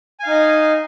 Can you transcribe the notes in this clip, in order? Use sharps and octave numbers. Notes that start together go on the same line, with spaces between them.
D#4 D#5 F5 G#5